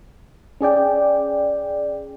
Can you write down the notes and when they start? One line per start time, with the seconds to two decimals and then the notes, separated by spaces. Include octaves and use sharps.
0.61 C#4 G#4 D5 G5